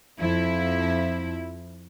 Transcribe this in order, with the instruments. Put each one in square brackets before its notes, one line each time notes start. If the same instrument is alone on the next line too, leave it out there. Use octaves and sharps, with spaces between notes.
[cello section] F2 F3 E4